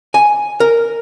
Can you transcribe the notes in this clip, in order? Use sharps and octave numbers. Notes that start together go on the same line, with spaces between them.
G#5
A#4